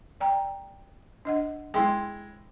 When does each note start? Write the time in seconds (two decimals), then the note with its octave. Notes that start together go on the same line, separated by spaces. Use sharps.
0.21 D5 G5 A#5
1.25 D4 D#5 F#5
1.74 G#3 E4 G5 C6